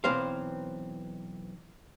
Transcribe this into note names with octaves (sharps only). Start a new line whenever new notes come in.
B1 E3 C4 C5 F5